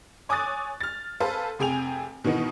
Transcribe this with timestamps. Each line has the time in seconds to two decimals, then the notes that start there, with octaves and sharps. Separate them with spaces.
0.29 C#5 G#5 D6 D#6 F#6 A6
0.81 F6 A6
1.20 G#4 A4 B4 C5 F5
1.59 F1 C3 G#4 G5 G#5 F7
2.24 B2 D#3 E3 B3 D#4